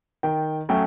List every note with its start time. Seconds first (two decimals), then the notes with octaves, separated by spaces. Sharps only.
0.23 D#3 G5
0.69 F#3 A3 C#4 G5